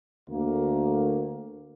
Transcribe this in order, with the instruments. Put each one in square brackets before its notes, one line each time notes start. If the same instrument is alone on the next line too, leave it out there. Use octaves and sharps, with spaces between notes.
[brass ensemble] D2 A3 A#3